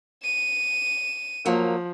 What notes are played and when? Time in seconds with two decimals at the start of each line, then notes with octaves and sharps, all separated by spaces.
0.23 D#7 E7
1.46 F3 F#3 A#3